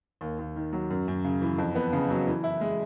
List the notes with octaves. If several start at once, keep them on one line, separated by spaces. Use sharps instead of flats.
D#2
D#2
D#3
F#3
F#2
F#2
C#3
E3
F2
B3
C#3
F#3
E3
E4
G#3